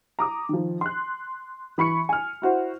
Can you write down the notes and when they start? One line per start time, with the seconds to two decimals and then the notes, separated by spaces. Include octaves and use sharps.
0.19 A#5 D6 D#6
0.49 D#3 F3
0.81 C6 F#6
1.78 E3 B5 C#6 C#7
2.09 G#5 F6
2.42 E4 F#4 C5